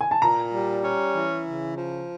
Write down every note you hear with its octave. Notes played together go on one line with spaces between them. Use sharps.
G#5
A5
A#2 A#5
G3
C#4
E3
C#3
F3